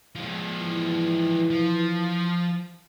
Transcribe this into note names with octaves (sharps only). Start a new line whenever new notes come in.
F3 G#3
E3
F3